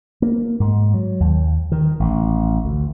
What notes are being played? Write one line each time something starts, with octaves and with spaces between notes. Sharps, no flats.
A#3
G#2
F#3
D#2
D#3
A1
D2